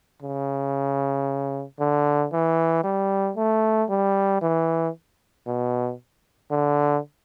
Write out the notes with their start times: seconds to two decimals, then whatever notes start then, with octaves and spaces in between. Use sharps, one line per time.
0.22 C#3
1.80 D3
2.32 E3
2.84 G3
3.37 A3
3.90 G3
4.42 E3
5.47 B2
6.51 D3